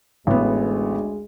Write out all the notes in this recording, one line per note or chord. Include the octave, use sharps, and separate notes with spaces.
A1 D2 G#3 B3